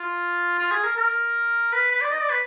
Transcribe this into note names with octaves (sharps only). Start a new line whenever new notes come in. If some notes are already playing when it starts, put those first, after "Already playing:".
Already playing: F4
F4
G#4
A#4
A#4
B4
B4
D5
D#5
D5
B4